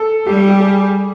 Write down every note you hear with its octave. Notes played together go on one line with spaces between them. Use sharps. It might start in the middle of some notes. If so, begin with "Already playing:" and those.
Already playing: A4
G3 G4
G4
G4
G#4